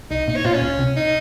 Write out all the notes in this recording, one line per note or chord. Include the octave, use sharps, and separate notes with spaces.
C2 D#4
A#2 D#4
C#5
A#2 F4
C#4
C#2
C3
D#4